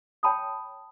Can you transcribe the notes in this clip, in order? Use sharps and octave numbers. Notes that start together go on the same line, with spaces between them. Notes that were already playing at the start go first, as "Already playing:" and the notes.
C#5 G5 A5 B5 D#6